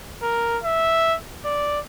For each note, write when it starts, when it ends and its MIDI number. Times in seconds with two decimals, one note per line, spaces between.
0.22 0.58 70
0.64 1.16 76
1.45 1.79 74